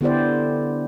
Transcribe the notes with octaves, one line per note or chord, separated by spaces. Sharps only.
D3 B3 E4 G4 C5 D5